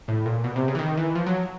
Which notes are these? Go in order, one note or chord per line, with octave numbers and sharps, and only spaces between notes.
A2
A#2
B2
C3
C#3
E3
D#3
E3
F3
F#3